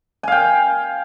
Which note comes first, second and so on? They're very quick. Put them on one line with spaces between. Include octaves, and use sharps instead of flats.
G#5 F5 G5